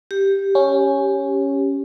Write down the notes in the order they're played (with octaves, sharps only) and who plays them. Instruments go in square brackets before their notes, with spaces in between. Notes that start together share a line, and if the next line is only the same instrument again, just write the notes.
[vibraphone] G4
[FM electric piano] C#4